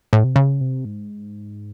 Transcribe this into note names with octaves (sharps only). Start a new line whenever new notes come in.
A2
C3
C#3
C3
G#2